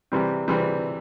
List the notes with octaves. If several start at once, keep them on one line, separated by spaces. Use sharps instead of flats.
C3 E3 G3 C4
C3 E3 G3 C4